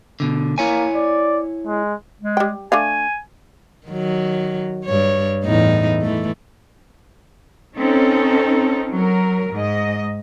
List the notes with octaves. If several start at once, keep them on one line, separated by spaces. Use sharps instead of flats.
B2 D3
A#3 E4 C#5 G#5
D5
G#3
G#3
G3 G5
A3 D4 F5 G#5
D#3 F#3
G2 C#5
E2 A2 D#4
E3 A3
C4 C#4 D#4 A4
F#3 A#4
G#2 D#5